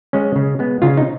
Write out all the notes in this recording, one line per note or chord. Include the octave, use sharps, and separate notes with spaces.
G#3 C#4
C#3
G#3 B3
C#3 F4
D#4